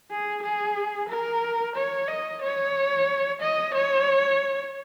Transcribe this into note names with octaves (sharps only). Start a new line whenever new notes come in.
G#4
G#4
A#4
C#5
D#5
C#5
D#5
C#5